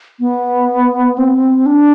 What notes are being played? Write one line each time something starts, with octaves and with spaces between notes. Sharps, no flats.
B3
C4
D4